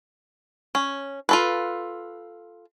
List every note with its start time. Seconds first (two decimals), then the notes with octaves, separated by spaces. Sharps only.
0.75 C#4
1.29 F4 A4 B4